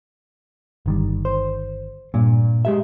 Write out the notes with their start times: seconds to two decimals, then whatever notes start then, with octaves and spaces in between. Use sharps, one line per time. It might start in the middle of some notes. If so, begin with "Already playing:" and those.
0.86 G1 D#3 G3
1.25 C5
2.14 G2 A#2
2.65 G#3 G4 E5